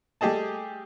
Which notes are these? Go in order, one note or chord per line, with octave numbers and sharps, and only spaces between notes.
G3 A3 G4 G#4 D#5 A5